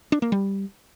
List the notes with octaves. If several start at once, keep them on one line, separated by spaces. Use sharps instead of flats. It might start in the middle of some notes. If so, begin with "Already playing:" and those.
D4
A#3
G3